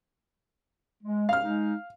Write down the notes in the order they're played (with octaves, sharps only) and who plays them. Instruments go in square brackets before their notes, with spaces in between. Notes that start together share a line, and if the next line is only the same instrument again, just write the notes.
[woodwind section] G#3
[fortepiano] F5 F6
[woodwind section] G#3 D#4